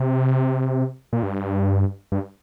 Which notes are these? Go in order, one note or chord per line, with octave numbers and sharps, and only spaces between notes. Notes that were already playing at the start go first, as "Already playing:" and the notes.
Already playing: C3
A#2
G2
G2